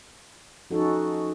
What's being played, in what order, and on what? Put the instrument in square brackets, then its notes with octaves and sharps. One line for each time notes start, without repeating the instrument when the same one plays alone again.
[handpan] F3 C#4 D#4 F#4 A4